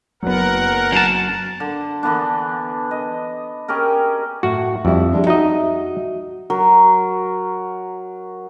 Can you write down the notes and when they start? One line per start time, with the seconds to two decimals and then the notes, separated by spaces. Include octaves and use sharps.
0.23 F#1 F#3 B3 A#4 F#5
0.92 F#2 A5
1.60 D3
2.03 D3 E3 B3 D4
2.91 D#5
3.68 C#4 G4 G#4 A#4
4.43 A2 F#4
4.85 F2 G3 E4
5.12 G3 G#3 D4
5.27 D#4 F#4 D#5 E5
6.50 F#3 A#4